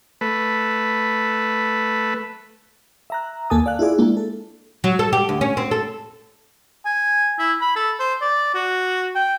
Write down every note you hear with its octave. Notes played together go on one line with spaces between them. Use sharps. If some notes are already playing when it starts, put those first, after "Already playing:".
A3 B4
E5 A#5 F#6
D#2 A#3 A4 G#5 A5 D#6
D5 F5 F#6
E4 F4 G#4 D5
G#3 A#3 D4 E4 F4
A4
F#3
A4
G4
D2
C#4
C4
A4
G#5
E4
B5
A4
C5
D5
F#4
G5